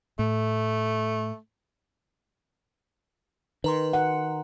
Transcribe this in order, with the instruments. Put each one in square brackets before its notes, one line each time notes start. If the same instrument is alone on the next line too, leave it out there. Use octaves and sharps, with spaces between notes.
[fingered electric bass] A2 [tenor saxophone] A3
[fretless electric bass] D#3 [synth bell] B4 A#5 C6
[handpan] F#5